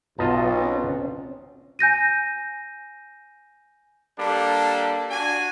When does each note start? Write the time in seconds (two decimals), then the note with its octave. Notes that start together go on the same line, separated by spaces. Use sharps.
0.19 B1 B3 F4 F#4 D#5 A5
0.64 C4 C#4
1.79 G#5 G6 A#6 D#7
4.18 G3 A#3 D4 A4
5.10 D4 F#4 G#5